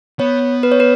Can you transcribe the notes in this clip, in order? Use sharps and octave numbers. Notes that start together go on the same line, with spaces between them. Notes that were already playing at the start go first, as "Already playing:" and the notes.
B3 C#5
B4
C#5
B4